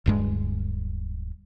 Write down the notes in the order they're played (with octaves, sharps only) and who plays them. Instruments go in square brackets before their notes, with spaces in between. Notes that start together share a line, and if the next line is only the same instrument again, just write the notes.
[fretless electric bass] D1 G2 G#3